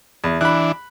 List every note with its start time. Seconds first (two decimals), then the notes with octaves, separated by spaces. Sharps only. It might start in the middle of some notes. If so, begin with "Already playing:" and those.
0.24 E2
0.41 E3 D4 B5 F#6